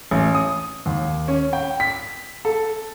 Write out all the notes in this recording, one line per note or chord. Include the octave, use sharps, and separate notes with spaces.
A1
D#6
D#2
C#4
G5
B6
A4